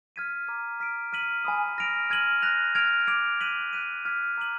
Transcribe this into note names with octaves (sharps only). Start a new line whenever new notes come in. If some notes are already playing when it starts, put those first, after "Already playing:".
F6 G#6 B6 D#7
A#5 D6 G#6
F6 B6 D7
F6 B6 D#7 F#7
G#5 B5 D#6
F6 A#6 D7 F7
F6 G#6 D#7 F#7
F#6 A#6 F7
F6 G#6 D7 F7
D6 G#6 D7 F7
F#6 B6 D#7 F#7
F#6 B6 D#7
D6 F6 G#6 B6
A#5 D6 G#6 D#7 F#7